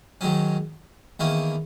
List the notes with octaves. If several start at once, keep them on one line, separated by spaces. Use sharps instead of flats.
G#2 D#3 F#3 C#4
E2 D#3 A#3 C#4 E4